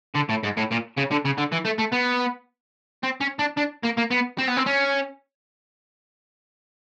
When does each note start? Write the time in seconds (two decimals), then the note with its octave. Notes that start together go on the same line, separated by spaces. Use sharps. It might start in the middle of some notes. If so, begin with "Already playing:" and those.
0.15 D3
0.30 A2
0.44 G#2
0.57 A2
0.71 A#2
0.97 C#3
1.11 D3
1.25 C#3
1.38 D3
1.52 E3
1.65 A3
1.79 A3
1.93 B3
3.03 C4
3.21 C#4
3.39 D4
3.58 D4
3.85 A#3
3.98 A#3
4.11 B3
4.38 C4
4.47 B3
4.57 C4
4.66 C#4